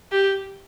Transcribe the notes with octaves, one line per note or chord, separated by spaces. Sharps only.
G4